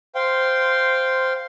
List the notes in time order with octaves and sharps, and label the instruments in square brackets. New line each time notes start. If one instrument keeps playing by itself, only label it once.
[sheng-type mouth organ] C5 F5 G5 C6